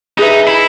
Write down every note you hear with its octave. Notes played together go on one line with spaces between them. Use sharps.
D#4 G#4 B4 E5
E4